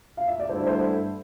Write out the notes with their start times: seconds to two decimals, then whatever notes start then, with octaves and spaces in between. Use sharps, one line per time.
0.17 F5
0.28 E5
0.40 D5
0.49 G2 D3 A3 E4 C5
0.67 C5